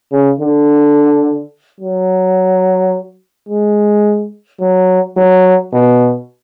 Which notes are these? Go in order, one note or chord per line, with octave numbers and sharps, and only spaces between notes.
C#3
D3
F#3
G#3
F#3
F#3
B2